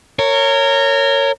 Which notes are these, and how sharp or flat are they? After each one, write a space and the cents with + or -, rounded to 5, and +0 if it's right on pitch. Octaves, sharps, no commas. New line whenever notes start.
A#4 -25 C#5 +0